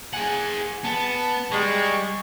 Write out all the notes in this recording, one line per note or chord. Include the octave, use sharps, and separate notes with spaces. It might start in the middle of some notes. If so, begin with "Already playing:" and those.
G#4 F#5 G#5
B3 A5
G3 G#3 C#6